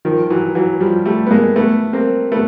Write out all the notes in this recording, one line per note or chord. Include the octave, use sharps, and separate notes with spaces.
D#3 F3
E3 F#3
E3 F#3
F3 G3
G3 A3
B3
G#3 A#3
A3 B3
A#3 C4
A3 B3